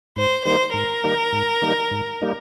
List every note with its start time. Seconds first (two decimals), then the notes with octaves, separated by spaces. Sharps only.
0.16 G#2 C5
0.45 D#3 G3 A#3 D#4 C5
0.74 G#2 A#4
1.04 D#3 G3 A#3 D#4
1.33 G#2
1.62 D#3 G3 A#3 D#4
1.91 G#2
2.22 G3 A#3 D#4